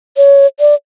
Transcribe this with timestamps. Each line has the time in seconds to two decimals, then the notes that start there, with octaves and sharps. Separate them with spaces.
0.17 C#5
0.60 D5